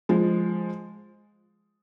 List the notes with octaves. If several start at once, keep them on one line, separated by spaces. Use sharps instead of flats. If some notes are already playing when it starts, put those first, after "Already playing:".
F3 G#3